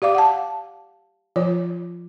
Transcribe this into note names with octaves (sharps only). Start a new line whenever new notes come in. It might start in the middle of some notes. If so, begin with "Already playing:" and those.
G4 D5 F5 D6
F#5 A5
F3 F4 C#5